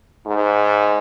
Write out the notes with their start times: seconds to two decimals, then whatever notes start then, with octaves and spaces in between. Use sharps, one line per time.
0.26 G#2